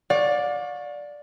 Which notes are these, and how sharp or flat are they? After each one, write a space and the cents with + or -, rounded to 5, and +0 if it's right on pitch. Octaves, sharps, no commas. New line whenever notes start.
D5 +0 F5 +45 C#6 -5